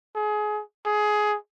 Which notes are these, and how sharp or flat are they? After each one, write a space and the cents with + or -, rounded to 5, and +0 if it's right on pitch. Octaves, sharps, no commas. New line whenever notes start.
G#4 +25
G#4 +15